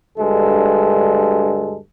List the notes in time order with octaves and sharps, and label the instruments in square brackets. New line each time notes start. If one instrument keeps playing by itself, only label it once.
[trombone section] D2 G2 G#3 A4